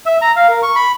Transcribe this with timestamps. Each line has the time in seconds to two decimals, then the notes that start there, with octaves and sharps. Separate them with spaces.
0.06 E5
0.22 A#5
0.36 F5
0.48 A#4
0.63 C#6
0.76 B5